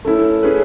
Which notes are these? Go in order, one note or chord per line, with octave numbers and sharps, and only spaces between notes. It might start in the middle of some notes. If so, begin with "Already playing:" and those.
A3 C#4 E4 A4
A3 C#4 G#4 B4